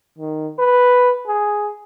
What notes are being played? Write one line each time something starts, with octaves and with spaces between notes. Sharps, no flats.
D#3
B4
G#4